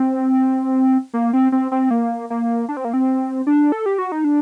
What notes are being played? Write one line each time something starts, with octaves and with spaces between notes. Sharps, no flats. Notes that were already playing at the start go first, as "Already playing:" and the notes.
Already playing: C4
A#3
C4
C4
C4
A#3
A#3
D4
C4
A#3
C4
D4
A4
G4
F#4
D#4
D4